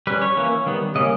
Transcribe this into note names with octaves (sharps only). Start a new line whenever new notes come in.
G3 C#4 B4
C#5
E3 A#3 C#4
D#3 G3 B3
C#3 G3 A#3 C#4 D#5